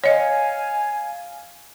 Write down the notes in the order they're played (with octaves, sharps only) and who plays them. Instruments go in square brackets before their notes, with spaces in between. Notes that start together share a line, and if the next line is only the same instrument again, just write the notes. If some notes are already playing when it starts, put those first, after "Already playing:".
[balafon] C#5 D#5 [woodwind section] F5 G#5